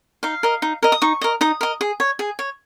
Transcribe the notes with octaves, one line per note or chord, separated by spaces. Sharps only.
D#4 F5
A#4 D#5
D#4
A#4 D#5
D#6
D#4 C#6
A#4 D#5
D#4 D#6
A#4 D#5
G#4
C#5
G#4
C#5